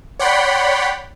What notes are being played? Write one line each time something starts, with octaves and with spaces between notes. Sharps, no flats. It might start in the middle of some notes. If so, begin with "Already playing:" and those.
C#5 D5 F#5 G5 B5 C6